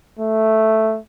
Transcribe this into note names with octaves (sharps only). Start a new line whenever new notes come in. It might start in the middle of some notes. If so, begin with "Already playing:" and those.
A3